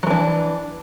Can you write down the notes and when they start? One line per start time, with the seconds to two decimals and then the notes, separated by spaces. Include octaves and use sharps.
0.03 F#3
0.07 E3
0.10 D4